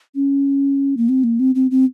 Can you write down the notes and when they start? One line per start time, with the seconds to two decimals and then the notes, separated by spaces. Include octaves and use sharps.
0.15 C#4
0.97 A#3
1.09 C4
1.24 A#3
1.40 C4
1.55 C4
1.71 C4